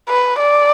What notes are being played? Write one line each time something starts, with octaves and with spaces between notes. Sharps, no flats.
B4
D5